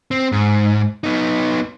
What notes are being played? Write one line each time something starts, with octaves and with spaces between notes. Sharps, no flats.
C4
G#2
B3 D#4